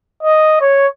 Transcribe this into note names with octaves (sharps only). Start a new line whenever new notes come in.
D#5
C#5